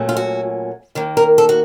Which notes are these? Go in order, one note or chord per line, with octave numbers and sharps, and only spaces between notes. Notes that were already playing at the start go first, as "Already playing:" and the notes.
Already playing: A#2 F#3 A3 C#4
F4
F#4
D#2 D#3 A#3
A#4
A4
F#4